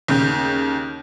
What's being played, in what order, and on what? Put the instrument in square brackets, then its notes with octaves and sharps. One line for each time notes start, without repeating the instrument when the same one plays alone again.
[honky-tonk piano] D#2 C#3 G6